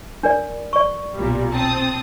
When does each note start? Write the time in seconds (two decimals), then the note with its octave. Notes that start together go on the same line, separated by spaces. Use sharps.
0.23 D4 A#4 D5
0.73 D5 C#6
1.16 B1 A#2 G3
1.50 C4 A5 D#6